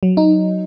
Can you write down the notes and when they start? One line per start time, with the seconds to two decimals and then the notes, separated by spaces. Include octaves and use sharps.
0.03 F#3
0.17 D#4